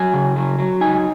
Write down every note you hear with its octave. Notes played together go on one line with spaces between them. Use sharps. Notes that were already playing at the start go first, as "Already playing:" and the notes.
Already playing: F#3 G#5
C#3
F#3
F#3
D#4 G#5